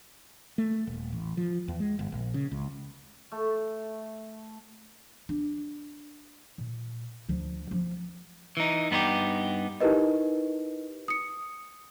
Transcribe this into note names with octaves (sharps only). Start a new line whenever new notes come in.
A3
D#1
A1
F3
E2
G#3
G1
A#1
C#3
C#2
A3
D4
A#2
D2 F3
F3 A#3
E3 D#4
G2 B3 D#4 F4 G4
D#4 E4 G4 A#4 B4 D#5
D#6 C#7